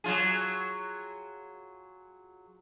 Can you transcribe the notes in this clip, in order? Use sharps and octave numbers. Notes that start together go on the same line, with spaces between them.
F#3 F4 G#4